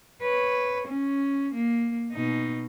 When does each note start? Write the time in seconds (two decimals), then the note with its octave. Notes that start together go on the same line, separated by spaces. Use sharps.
0.22 B4 C#5
0.87 C#4
1.54 A#3
2.12 B2 D#4